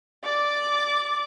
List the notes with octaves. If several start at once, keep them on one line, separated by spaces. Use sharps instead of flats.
D5 D6